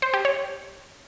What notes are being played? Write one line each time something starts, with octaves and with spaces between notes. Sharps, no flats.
C5
G4
C#5